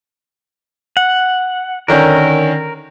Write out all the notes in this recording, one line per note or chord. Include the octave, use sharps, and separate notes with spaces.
F#5
D3 D#3 C#4 A#4